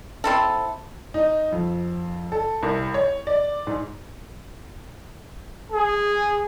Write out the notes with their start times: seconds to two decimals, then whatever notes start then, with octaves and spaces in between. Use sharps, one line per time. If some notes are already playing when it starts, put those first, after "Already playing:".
0.24 C4 E4 A4
1.14 D#4
1.52 F2
2.32 A4
2.63 C2
2.94 C#5
3.27 D5
3.67 G#2
5.72 G#4